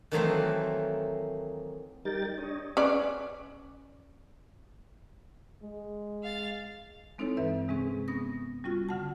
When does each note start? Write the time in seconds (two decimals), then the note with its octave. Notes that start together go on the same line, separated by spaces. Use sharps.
0.11 D#3 E3 F#3 A3 A#3 C4
2.05 G3 D#4 G4 A#4 G5 A6
2.38 D4 C#5 D#5
2.77 C#4 B4 D5
5.63 G#3
6.23 F5 A6
7.18 G#3 C4 D#4 E4 A4 C#5
7.37 G2 E3 B4 E5
7.68 C3 G#3 C4 C#4 G#4
8.08 B3 C#4 D#6 A#6
8.64 G3 C#4 F4 F#4
8.89 D3 F#5 A5